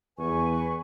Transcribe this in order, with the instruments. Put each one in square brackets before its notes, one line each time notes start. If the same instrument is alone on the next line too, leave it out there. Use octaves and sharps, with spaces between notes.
[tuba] E2 [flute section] B4 G#5 C#6